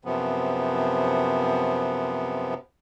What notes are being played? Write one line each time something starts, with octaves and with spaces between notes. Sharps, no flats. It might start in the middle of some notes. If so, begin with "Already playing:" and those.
F#2 C3 F3 B3